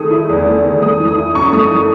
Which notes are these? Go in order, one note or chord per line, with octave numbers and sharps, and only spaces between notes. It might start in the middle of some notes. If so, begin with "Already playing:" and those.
Already playing: D#3 G#3 A3 D#6
E4
E2
A3
D#3
A3 D#6
E3
D#6
E4
F#2 C#6
A3 D#6
E3